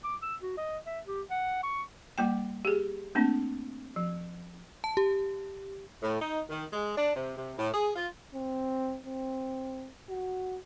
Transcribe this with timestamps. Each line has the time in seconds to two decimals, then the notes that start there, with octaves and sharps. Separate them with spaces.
0.04 D6
0.22 E6
0.42 F#4
0.57 D#5
0.86 E5
1.07 G4
1.30 F#5
1.63 C#6
2.18 G3 A#3 G5
2.65 G4 G#4
3.15 A3 A#3 C4 D4
3.96 F3
4.84 A5
4.97 G4
6.02 A2
6.20 D#4
6.49 D#3
6.73 G#3
6.97 D4
7.14 C3
7.37 C3
7.58 A2
7.74 G#4
7.96 F4
8.35 C4
9.06 C4
10.09 F#4